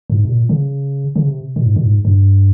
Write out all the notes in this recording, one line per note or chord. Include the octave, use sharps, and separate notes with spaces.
G#2
C3
A#2
C#3
C#3
C3
A#2
G#2
A#2
G#2
G2